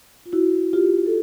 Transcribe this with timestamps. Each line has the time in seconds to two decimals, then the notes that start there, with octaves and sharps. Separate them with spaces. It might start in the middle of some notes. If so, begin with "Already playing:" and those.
0.26 F4
0.32 E4 F#4
0.73 F4 G4
1.06 A4